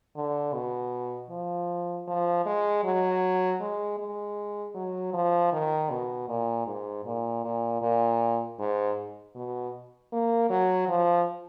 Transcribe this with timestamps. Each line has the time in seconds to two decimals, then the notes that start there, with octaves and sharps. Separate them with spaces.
0.16 D3
0.54 B2
1.30 F3
2.08 F3
2.46 G#3
2.84 F#3
3.61 G#3
3.99 G#3
4.75 F#3
5.14 F3
5.53 D#3
5.90 B2
6.28 A#2
6.67 G#2
7.05 A#2
7.44 A#2
7.82 A#2
8.59 G#2
9.35 B2
10.12 A#3
10.50 F#3
10.89 F3